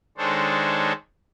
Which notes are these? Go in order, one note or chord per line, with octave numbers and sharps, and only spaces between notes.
D#3 G#3 D4 A4 C5 C#5